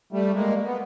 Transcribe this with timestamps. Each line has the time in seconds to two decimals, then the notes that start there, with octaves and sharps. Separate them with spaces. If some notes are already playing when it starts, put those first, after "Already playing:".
0.13 G3 A3
0.34 G#3 A#3
0.66 B3